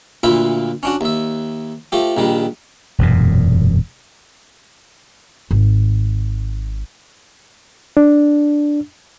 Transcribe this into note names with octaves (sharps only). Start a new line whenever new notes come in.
D2 A#2 F4 E5 B5
C#4 D4 F#4
D#2 E5
F3 A3 G4
A#1 D#3 G3
E1 F#2 A#2
G#1
D4